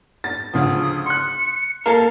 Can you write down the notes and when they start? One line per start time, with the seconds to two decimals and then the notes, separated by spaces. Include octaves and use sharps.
0.24 A6
0.54 D2 C#3 F3 D#6
1.06 C6 F#6 C#7
1.86 A#3 A4 A#4 C7